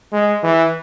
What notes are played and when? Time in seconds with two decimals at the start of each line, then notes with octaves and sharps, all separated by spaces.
0.12 G#3
0.43 E3